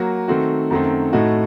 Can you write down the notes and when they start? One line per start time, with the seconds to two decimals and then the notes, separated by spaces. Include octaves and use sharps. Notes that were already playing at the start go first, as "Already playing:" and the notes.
Already playing: F#3 A#3 F#4
0.28 D#3 A3 C4 F#4
0.70 F#2 D#3 A3 C4
1.13 A2 A3 D#4 F#4